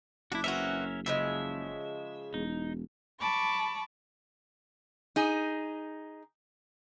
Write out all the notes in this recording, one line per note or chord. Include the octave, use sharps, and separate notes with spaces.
F#1 D4 E4 F#4
E3 C4 C#4 F#4 A#4 E5
C#3 F3 G#3 E5
E1 D#4
A5 B5 C#6 D6
D#4 G#4